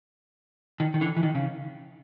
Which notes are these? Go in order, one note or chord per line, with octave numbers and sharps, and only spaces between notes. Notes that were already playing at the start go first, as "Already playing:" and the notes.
D#3
D#3
D3 E3
E3
D#3
C#3